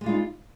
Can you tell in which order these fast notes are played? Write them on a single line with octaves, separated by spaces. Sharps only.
G#3 G3 F4 D#4